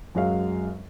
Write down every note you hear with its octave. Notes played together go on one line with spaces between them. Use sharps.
F#2 F#3 G#3 F5